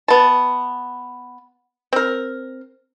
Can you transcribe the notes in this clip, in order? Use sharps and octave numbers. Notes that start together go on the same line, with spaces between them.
B3 A5
C4 A#4